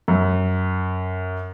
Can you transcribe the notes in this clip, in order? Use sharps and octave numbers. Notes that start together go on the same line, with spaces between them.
F#2